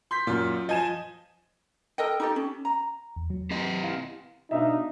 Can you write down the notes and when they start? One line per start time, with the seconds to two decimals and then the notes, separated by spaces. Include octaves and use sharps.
0.11 C6 G6 B6
0.27 F#2 A#2 F4 F#4
0.69 F3 D#5 G#5 E7
1.98 A4 A#4 D#5 G5
2.20 D#4 G4 A4
2.36 C#4
2.65 A#5
3.16 E2
3.30 F#3
3.51 C4 G4 D#5
3.83 E4 F5
4.51 B2 D4 D#4 E5 F5